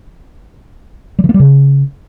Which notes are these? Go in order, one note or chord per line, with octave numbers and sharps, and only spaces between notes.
G3
E3
A#3
G3
C#3